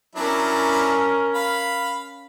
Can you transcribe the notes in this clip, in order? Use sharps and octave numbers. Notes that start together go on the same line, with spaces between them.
F#3 C#4 D4 E4 A#4
F5 B5